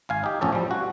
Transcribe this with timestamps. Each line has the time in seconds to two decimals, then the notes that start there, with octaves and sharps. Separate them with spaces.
0.09 G#1 F5 G#5
0.24 D#4 G4
0.41 A1 F2 C#4 A4
0.53 F3 G3
0.71 F#4